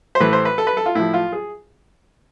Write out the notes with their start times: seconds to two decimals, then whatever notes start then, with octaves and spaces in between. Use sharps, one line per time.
0.15 C5
0.20 A2 E3 B4
0.33 C5
0.45 B4
0.58 A4
0.67 B4
0.77 A4
0.86 F4
0.95 A2 F3 E4
1.14 F4
1.32 G#4